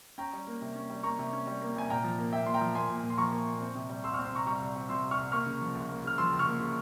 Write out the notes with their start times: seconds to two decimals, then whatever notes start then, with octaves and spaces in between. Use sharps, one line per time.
0.18 C#4 G5 A#5
0.33 G3
0.47 A#3
0.62 C3
0.76 C#4
0.90 G3
1.03 A#3 A#5 C#6
1.19 C3
1.33 C#4
1.47 G3
1.62 A#3
1.76 C3 G#5
1.89 A#2 G5 A#5
2.04 F3
2.19 A#3
2.32 A#2 E5 G5
2.46 A#2 C6
2.54 G5 A#5
2.61 F3
2.75 A#3 G#5 C6
2.90 A#2
3.03 A#2
3.10 C6
3.18 F3 A#5 C#6
3.32 A#3
3.46 A#2
3.60 C4
3.75 C3
3.89 G3
4.04 C2 C6 E6
4.14 C#6 F6
4.19 C4
4.25 C6 E6
4.32 C3 A#5 C#6
4.46 G3 A#5 C#6
4.60 C2
4.75 C4
4.89 C3 C6 E6
5.03 G3
5.11 C#6 F6
5.18 C2
5.32 A#3 C#6 F6
5.46 C#3
5.61 F3
5.75 C#2
5.89 A#3
6.04 C#3 F6
6.18 F3 C6 E6
6.33 C#2
6.39 C#6 F6
6.47 A#3
6.60 C#3